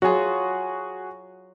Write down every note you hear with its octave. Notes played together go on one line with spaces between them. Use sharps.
F#3 F4 F#4 G#4